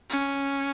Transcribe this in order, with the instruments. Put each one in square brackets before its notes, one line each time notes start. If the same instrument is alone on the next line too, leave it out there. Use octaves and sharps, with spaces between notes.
[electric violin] C#4